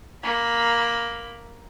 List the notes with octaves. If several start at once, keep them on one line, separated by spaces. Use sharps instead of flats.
A#3 B5